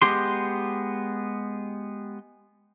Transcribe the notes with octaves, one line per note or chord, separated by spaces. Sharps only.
G#3 B3 G4 C6